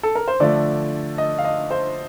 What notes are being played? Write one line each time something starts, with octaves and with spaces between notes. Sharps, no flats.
A4
A#4
C5
D3 F3 A3 D5
D#5
F5
D#5
C5